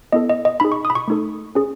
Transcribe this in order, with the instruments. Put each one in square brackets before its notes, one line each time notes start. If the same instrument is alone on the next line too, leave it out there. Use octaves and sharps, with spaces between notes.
[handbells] B3 E4 A4 D#5
D#5
D#5
D#4 G#4 B5
C#6
D#6
B5
C#6
A3 D#4 A4
C#4 G#4